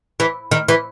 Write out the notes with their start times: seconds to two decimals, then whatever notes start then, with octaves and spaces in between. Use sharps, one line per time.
0.20 E3
0.51 D#3
0.69 E3